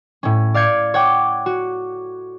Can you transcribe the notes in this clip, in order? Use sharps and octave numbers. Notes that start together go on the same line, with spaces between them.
A2 C#4
D5 F5 G6 G#6 C#7 D7
C#5 F#5 G5 D6
F#4